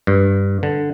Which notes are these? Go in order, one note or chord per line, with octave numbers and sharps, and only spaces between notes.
G2
D3